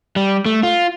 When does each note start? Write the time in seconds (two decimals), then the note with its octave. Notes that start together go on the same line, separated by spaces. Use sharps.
0.16 G3
0.46 A3
0.63 F4